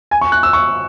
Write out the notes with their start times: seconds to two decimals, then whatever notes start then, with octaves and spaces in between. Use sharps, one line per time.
0.11 G#5
0.21 C#6
0.32 F#6
0.43 E6
0.53 C#6